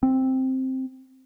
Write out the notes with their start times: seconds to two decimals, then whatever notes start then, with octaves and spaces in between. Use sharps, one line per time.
0.03 C4